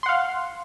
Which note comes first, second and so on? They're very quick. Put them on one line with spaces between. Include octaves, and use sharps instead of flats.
C6 F#5 F5